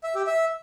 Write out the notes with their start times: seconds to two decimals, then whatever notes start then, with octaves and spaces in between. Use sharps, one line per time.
0.03 E5
0.15 G4
0.27 E5